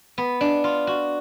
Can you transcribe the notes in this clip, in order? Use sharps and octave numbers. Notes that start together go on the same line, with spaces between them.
B3
D4
F4
F#4